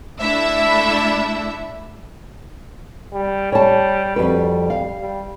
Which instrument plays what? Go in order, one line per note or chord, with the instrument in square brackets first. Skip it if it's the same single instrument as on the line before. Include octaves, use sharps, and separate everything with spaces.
[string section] A3 D4 E4 E5
[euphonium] G3
[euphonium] G3 [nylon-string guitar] C#5 A5
[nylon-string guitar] F2 F#4 B4 [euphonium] G3
[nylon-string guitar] F5
[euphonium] G3